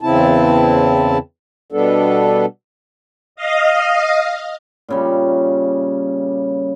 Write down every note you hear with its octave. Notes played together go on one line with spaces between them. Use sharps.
E2 C#3 C4 E4 A5
B2 G3 B3 D4 A4
D#5 F5
A#2 C#3 G3